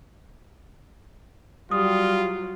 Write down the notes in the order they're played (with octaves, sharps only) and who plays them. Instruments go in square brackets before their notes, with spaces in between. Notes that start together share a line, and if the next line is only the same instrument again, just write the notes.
[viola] F#3 [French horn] G3 [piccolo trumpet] F4 [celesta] D#6